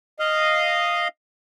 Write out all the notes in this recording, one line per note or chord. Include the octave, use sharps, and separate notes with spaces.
D#5 F5